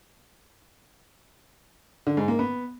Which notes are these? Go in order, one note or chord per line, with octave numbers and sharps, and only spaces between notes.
D3
G#2
A#3
B3